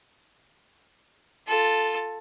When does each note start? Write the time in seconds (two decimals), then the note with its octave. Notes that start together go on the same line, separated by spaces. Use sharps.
1.48 F4 A4